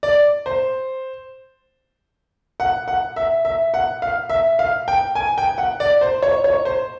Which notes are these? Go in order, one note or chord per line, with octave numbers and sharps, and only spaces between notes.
D5
C5
F#5
F#5
E5
E5
F#5
F5
E5
F5
G5
G#5
G5
F#5
D5
C5
C#5
C#5
C5